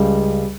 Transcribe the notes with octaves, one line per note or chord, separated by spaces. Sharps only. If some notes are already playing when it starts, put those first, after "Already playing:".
Already playing: C#2 C#3 G3